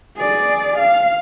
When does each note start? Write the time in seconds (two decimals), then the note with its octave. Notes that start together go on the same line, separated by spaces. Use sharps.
0.16 G#4 D5
0.78 F5